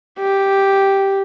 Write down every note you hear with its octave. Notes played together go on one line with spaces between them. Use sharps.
G4